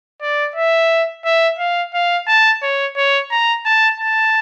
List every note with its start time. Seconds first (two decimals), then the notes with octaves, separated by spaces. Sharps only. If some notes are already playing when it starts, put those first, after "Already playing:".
0.22 D5
0.56 E5
1.25 E5
1.59 F5
1.94 F5
2.28 A5
2.62 C#5
2.96 C#5
3.31 A#5
3.65 A5
4.00 A5